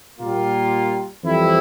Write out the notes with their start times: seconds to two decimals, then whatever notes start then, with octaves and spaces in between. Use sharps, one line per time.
0.16 A#2 G3 A#3 F4
1.24 F2 E3 G3 C4 E4